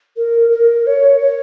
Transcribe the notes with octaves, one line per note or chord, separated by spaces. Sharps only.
A#4
A#4
C#5
C#5